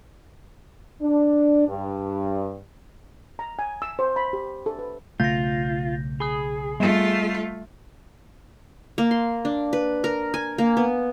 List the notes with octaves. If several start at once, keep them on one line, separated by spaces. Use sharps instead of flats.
D4
G2
A#5
G#5
E6
C5
B5
G4
A4
B4
B1 C#3 A3 F4 G6 A#6
G#4 B5 D#6
G3 A3 F4
A#3
C6
D4
B4
A#4
G#5
A#3
B3